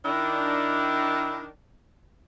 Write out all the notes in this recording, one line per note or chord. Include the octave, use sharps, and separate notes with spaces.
D#3 D4 E4